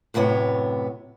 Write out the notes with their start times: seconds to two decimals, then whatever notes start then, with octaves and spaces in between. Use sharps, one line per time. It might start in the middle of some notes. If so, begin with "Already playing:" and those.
0.14 F#2 A2 C3 B3 C#5